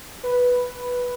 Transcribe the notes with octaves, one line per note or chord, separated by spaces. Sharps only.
B4